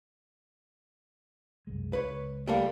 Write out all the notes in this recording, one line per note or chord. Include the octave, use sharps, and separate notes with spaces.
F#1 C2 G#3
C#2 B4 C#5
G3 A3 A#3